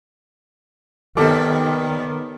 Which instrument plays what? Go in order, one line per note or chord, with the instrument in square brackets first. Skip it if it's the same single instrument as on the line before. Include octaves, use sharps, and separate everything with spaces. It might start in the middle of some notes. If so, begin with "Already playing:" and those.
[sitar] D#2 G3 [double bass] D#3 [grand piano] B3 D6 [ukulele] A4